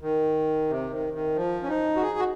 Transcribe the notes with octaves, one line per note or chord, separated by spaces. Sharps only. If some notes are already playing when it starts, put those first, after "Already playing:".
D#3
C3
D#3
D#3
F3
C#4
D#4
F#4
G#4
F#4